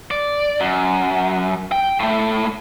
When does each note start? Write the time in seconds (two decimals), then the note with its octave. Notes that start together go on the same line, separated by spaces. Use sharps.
0.11 D5
0.60 F#2
1.72 G5
2.00 A2 A3